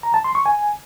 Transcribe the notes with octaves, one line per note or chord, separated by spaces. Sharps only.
A#5
A5
C6
C#6
G#5